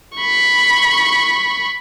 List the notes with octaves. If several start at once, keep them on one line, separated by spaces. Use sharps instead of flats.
B5 C#6